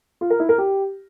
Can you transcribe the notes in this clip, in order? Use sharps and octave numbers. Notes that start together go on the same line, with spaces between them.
F4
A#4
E4
A#4
G4